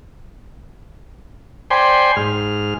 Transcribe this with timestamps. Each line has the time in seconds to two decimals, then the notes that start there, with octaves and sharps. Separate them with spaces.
1.71 C5 D5 G5 G#5 B5 C6
2.16 G#2 F6